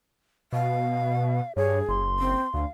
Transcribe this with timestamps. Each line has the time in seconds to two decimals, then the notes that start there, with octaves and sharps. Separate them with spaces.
0.53 B2 F5
1.56 G2 G#4 C#5
1.89 F#1 C6
2.19 C4
2.54 D2 F5